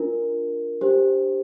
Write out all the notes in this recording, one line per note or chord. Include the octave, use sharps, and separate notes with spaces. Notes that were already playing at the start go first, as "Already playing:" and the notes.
Already playing: D4 F4 A#4
D4 G4 C5